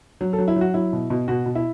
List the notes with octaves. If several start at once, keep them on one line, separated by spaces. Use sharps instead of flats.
F#3
A4
F#3
E4
F#3 F#4
F#3 E4
B2
B2
B2 F#4
B2
E4